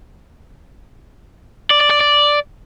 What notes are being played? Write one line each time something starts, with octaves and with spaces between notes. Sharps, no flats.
D5
D5
D5
D5